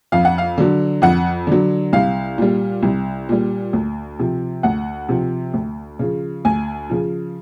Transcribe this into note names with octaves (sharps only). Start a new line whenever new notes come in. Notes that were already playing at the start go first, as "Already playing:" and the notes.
F2 F5
F#5
F5
D3 F#3
F2 F#5
D3 F#3
C2 F5
A#2 G3
C2
A#2 G3
D2
C3 F3
D2 F#5
C3 F3
D2
C#3 F3
D2 G#5
C#3 F3